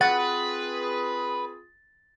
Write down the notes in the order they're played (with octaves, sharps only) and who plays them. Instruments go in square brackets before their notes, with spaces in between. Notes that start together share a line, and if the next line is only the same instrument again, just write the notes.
[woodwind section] C4 F4 G#4 [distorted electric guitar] B4 [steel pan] F#5 [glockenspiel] A6